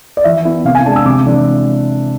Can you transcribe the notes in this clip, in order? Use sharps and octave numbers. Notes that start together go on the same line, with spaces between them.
D5
E3 E5
B3 E4
C3 F5
G#5
G#3 D4 A5
E6
C3 D6
E3 G#3 D4